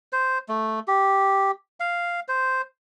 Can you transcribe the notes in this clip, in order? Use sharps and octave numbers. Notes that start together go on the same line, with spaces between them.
C5
A3
G4
F5
C5